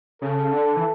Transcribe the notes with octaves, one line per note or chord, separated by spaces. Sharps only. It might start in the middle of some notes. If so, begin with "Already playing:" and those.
C#3 A4
D3
E3